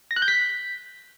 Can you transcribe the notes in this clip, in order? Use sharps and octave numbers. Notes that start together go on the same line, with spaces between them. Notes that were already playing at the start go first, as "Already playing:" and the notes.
A#6
F#6
G6
B6